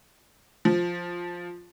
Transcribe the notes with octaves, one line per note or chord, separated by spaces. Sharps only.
F3